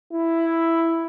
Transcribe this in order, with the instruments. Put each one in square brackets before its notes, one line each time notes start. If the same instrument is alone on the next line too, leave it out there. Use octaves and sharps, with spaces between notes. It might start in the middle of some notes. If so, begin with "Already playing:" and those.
[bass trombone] E4